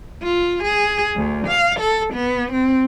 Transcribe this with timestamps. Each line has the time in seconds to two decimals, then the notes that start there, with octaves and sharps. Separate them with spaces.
0.22 F4
0.64 G#4
1.16 D2
1.48 F5
1.80 A4
2.14 B3
2.52 C4